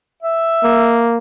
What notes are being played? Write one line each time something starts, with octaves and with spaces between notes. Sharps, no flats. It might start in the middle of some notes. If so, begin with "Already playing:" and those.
E5
A#3